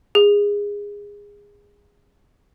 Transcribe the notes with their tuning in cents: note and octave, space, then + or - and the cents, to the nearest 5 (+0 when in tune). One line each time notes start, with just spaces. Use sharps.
G#4 -20